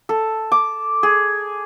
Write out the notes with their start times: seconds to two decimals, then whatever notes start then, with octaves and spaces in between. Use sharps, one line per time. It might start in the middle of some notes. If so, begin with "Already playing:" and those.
0.09 A4
0.52 D6
1.03 G#4